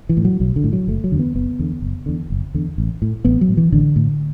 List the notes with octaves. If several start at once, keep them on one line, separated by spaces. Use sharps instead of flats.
E3
A2
F#3
B1 F#3
D3
A2
F#3
F#1 A3
F#3
E2 D3
B3
F#1 B3
E2 D3
F#1
E2 D3
F#1
E2 D3
A1
A2
A1 B3
F#3
A2
E3
A1 D3
A2